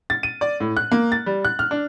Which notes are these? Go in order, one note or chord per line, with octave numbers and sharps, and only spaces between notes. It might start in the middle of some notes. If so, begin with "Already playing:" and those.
A6
D#7
D5
A2
F#6
A#3
A6
G3
F#6
F6
D4